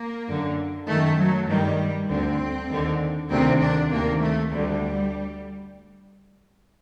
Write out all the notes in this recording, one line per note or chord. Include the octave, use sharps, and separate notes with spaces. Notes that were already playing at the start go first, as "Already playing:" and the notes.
Already playing: A#3
F#2 D3
F#2 D#3 A3
F#3
G2 D#3 G3
D2 D3 C4
D#2 D3
D2 C3 D#3 C4
D4
D2 C3 D#3 A#3
A3
D2 D3 G3